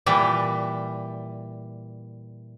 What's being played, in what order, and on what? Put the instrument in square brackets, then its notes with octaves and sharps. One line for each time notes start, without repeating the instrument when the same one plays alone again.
[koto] A#2 E3 G3